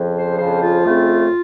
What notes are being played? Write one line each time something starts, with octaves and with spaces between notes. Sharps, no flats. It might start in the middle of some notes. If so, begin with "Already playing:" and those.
Already playing: F2 C#3 F3
C5
F2 C#3 F3 C5
F4
F2 C#3 A3 C4